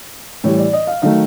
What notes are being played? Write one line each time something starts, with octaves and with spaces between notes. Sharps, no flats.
A2 E3 G3 C#5
D5
D#5
F5
D#3 F#3 A3 F5